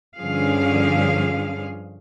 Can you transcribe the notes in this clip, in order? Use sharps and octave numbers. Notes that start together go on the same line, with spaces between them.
G2 D3 F3 C#4 G#4 F5